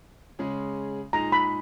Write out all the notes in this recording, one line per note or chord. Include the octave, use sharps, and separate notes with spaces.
C#3 G#3 C#4 G#4
A#2 G#3 D#4 G#4 A#5
B5